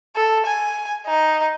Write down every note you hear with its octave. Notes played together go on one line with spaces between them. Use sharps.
A4
G#5
D#4